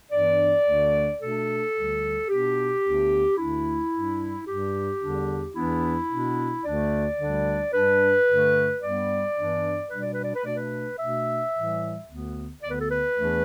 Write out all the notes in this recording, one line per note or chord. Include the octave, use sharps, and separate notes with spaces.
G2 E3 B3 D4 D5
D2 D3 A3 D4
B2 A3 D4 A4
D2 D3 G3
B2 B3 D4 G4
D2 D3 B3 D4
D2 D3 A3 D4 E4
G2 G3 D4
G2 G3 D4 G4
E2 D3 G3 D4
E2 E3 B3 D4 E4
B2 B3 D4
D2 D3 A3 D4 D5
D2 D3 G3 D4
G2 G3 D4 B4
G2 D3 A3
G2 G3 B3 D5
G2 E3 B3 D4
B2 G3 D4 B4
D5
B4
D5
B4
B2 A3 D4 D5
B4
B2 A3 D4 E5
A2 E3 G3
D2 D3 B3
D2 D3 B3 D5
B4
A4
B4
E2 E3 A3 D4